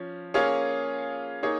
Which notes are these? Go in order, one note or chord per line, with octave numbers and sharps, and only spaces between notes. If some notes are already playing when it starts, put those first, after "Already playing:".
Already playing: F3 C#4
A#3 C#4 F4 G#4 C#5
A#3 D#4 G#4 C#5